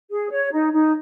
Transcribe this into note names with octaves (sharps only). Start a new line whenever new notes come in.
G#4
C#5
D#4
D#4